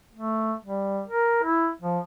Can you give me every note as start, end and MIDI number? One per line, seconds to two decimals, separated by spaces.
0.15 0.55 57
0.65 1.02 55
1.07 1.40 70
1.43 1.70 64
1.82 1.99 53